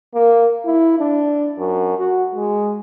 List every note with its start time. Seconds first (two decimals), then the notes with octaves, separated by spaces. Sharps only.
0.14 A#3
0.66 E4
0.99 D4
1.58 F#2
1.98 F#4
2.35 G#3